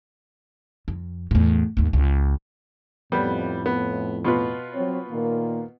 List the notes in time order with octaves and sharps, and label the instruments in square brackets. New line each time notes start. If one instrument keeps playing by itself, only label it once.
[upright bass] F2
E2 A2
D#2 G#2
C#2
[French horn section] F2 A2 [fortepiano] G3 B3
[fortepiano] B3
B2 F4 B4
[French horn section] F#3 C4 C#5
A#2 D#3 A#3